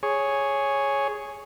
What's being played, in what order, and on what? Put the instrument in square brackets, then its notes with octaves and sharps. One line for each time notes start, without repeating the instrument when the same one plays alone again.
[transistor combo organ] G#4 C#5